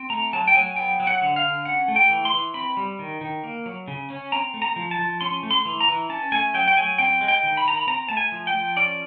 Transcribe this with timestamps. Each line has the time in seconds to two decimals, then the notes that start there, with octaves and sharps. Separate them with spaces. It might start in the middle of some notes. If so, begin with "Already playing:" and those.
Already playing: C4
0.10 A3 A#5
0.33 F#3 A5
0.47 G5
0.55 F#3 G#5
0.76 B3 G5
1.00 F#3
1.07 F#5
1.21 D3
1.36 F5
1.44 D3
1.65 C#4 F#5
1.88 A3
1.96 G5
2.10 E3
2.25 C6
2.33 E3
2.54 C4 B5
2.77 G3
2.99 D#3
3.21 D#3
3.44 A#3
3.66 F#3
3.88 C#3
4.10 C#4
4.32 C4 A#5
4.54 A3
4.62 A#5
4.76 F3
4.91 A5
4.99 F3
5.21 C#4 C6
5.43 A3
5.51 C6
5.65 E3
5.80 A#5
5.88 E3
6.09 C#4 A5
6.32 A3 G#5
6.54 F#3 G5
6.67 G5
6.77 F#3 G#5
6.98 C4 G5
7.21 G#3
7.28 G5
7.43 D#3
7.57 B5
7.65 D#3 A#5
7.77 B5
7.87 C4 A#5
8.09 A3 A5
8.17 G#5
8.32 F3
8.47 G5
8.54 F3
8.76 C#4 D5